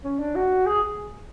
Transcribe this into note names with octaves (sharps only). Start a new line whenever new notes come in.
C#4
D4
F#4
G#4